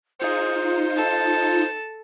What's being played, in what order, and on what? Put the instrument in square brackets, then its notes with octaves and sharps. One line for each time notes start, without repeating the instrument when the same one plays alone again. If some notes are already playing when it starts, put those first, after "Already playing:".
[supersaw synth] D#4 F4 C#7 [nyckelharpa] G#4 [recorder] C5
[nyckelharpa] A4 A5